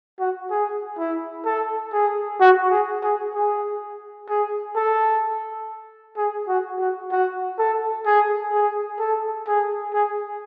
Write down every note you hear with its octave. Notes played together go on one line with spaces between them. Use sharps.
F#4
G#4
E4
A4
G#4
F#4
G#4
G#4
G#4
G#4
A4
G#4
F#4
F#4
F#4
A4
G#4
G#4
A4
G#4
G#4